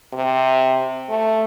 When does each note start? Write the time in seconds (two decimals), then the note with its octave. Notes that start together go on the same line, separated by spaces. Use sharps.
0.13 C3
1.09 A3